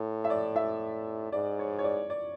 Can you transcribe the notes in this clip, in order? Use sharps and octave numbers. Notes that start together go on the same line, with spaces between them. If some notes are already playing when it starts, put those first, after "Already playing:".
Already playing: A2
E5
D5
E5
G#2 D5
C#5
C#5
D5
D5